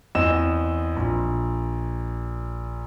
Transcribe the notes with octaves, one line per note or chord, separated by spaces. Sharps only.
E2 C4 D#5 E6 E7
A#1